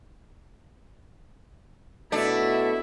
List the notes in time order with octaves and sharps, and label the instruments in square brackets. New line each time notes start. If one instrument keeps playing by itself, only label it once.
[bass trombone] B2 [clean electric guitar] A3 [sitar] D4 [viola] E4 E5